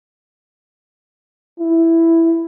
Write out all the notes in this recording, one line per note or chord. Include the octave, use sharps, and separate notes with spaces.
E4